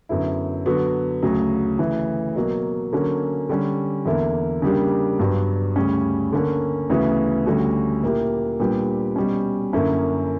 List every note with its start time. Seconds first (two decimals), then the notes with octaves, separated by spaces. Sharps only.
0.09 F#2 D3 F#3 B3 E4
0.66 D3 F#3 B3 F#4
1.22 D2 C#3 F#3
1.79 D2 C#3 E3
2.36 B2 F#3 A#3
2.92 D3 F#3 A#3 C#4
3.49 D3 G3 C#4
4.06 E2 D3 A#3 E4
4.62 C#3 G3 A#3 D4 G4
5.19 G2 F#3 B3 D4
5.76 D2 C#3 G3 C#4
6.32 D3 A#3 C#4
6.90 D2 C#3 E3 B3 F#4
7.46 D2 D3 G3 C#4 F#4
8.03 A#2 A#3 E4 G4
8.60 A#2 G3 B3 D4 G4
9.16 B2 G3 C#4
9.73 F#2 D3 A#3 C#4 E4